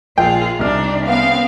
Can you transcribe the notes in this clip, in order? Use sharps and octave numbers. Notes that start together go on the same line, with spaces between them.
A#1 F4 G#4 G5
C2 C4 D4 D#4 F6
C#3 B3 C4 F5